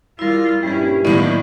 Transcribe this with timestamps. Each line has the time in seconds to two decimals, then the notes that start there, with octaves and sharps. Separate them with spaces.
0.19 G3 E4 F4 A#4
0.63 A#1 G2 G3 C#4 E4 G4
1.05 A2 D#3 F#3 G3 A#3 B3 D5 D#5